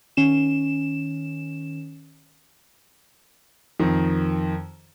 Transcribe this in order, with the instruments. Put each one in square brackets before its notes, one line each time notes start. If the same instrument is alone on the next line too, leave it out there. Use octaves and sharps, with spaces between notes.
[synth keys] D#3 C#4 E7
[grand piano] F2 D#3